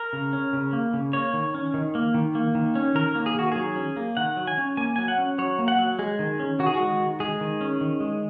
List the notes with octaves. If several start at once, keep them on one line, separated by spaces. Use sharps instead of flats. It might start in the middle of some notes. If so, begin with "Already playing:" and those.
Already playing: A#4
C#3
C#4
C#3
A#3
C#3
A#3 C#5
D#3
C#4
D#3
A#3
D#3
A#3
D#3
C#4
D#3 A#4
A#3
G#4
D#3 F#4
F#3 G#4
C#4
A#3
D#3 F#5
F#3
G#5
C#4
A#3 G#5
F#3 G#5
F#5
C#4
F#3 C#5
A#3
F#5
F#3
G#3 G#4
D#3
C#4
D#3 F#4
G#4
F#4
G#3
D#3
G#3 G#4
D#3
C#4
D#3
G#3